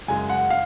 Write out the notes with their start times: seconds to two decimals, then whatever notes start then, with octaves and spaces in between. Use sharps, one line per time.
0.08 F#2 C#3 G#3 G#5
0.30 F#5
0.50 F5